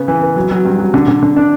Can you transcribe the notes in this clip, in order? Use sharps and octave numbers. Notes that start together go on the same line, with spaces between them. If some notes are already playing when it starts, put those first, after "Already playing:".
Already playing: C#3 B3
E3
B3
F#3
F#3
G2
F#3
D3
D3
D3
D4